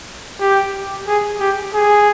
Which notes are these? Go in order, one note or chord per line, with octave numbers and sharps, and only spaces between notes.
G4
G#4
G4
G#4